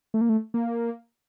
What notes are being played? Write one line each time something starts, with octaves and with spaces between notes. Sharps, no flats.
A3
A#3
A3
A#3